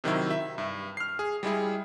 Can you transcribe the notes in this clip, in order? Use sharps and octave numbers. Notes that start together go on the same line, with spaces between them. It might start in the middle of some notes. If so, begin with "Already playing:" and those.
C3 D#3 F#3 E4
E5
G2
F6 C7
G#4
G3 G#3 E4 G#4